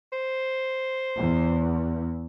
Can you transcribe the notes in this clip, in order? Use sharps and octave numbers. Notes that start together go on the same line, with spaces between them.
C5
E2